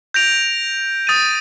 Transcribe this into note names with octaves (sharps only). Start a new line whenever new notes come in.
G6 A#6 D7 F7
D#6 A6 D#7